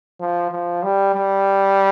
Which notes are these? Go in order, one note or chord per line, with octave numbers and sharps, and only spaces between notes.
F3
F3
G3
G3